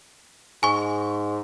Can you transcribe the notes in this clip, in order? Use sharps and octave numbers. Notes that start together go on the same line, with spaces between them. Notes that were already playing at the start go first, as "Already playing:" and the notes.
G#2 G#5 C#6